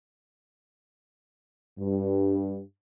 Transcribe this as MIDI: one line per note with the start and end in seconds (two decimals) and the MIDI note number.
1.78 2.61 43